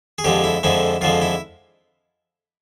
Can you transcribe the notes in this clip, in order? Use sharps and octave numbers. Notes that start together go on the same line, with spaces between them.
G#4
F2 D3 F3 G#3 G4
E4
F2 D3 F3 G#3 E4
F2 D3 F3 G#3 F4
E4